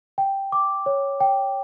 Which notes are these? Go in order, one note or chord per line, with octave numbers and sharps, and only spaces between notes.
G5
D6
C#5
G5